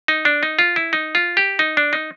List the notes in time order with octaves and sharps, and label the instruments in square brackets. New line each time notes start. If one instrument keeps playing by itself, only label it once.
[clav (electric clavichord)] D#4
D4
D#4
F4
E4
D#4
F4
G4
D#4
D4
D#4